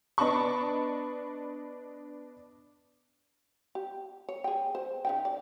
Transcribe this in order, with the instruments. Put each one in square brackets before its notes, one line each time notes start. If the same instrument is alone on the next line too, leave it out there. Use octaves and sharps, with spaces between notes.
[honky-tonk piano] B3 D4 D#5 A5 B5 C#6
[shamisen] G4
C#5
G#4 G5
C5
C#3 D#4 G5
D5